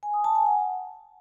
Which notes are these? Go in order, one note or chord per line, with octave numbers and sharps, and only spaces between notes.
G#5
D#6
A5
G#5
F#5